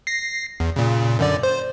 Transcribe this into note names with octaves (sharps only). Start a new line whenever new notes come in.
A#6 C7
E2
A#2 C#3
F#2 D3 D5
C5